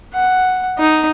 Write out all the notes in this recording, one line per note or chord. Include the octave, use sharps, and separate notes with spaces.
F#5
D#4